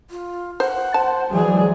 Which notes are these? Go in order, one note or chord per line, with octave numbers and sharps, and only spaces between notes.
F4
C5 F#5
C5 A5
E3 F#3 G#3 G#4 D5